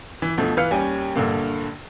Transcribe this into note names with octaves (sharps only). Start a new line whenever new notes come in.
E3
D2 B2 F3 A3
E3 B4 F5 F6 C#7
D#2 G3 C#4 G#5
A#1 G2 D3 A#3